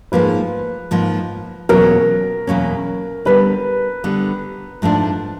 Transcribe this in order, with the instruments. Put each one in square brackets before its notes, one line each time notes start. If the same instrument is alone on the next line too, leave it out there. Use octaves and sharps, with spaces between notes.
[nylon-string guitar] G#2 F3 A#3 [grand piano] B4
[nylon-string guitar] G#2 F3 A#3
[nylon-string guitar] E2 B2 F#3 A#3 C#4 [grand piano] A#4
[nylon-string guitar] E2 B2 F#3 A#3 C#4
[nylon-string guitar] D3 G3 B3 [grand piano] B4
[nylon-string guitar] D3 G3 B3
G#2 F3 A3 D4